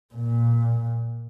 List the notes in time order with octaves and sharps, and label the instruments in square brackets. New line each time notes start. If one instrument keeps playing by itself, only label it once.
[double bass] A#2